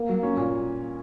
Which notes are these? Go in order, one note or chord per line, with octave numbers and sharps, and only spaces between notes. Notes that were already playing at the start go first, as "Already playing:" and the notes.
Already playing: A#3
F#3
C#4
A#2